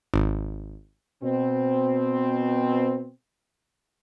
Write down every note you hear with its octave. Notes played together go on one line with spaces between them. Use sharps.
G#1
B2 C4